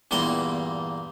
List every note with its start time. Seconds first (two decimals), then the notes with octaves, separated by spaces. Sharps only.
0.11 E2 G2 A#2 A#3 C6